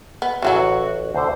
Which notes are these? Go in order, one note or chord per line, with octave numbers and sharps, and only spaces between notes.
B3
A1 C#3 E3 F#3 E4 F#4 E5
D2 D3 C5